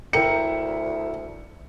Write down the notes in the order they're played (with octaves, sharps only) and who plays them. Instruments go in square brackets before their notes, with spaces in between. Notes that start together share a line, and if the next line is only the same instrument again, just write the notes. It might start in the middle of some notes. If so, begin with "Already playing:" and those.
[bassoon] D2 [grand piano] E4 E5 A#5 [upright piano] A#4 G5 [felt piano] C#7